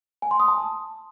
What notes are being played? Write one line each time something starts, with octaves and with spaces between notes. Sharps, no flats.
G#5
C6
D#6
A5